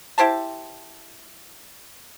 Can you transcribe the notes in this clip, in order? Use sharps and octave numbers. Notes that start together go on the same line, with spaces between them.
E4 G4 C5 A5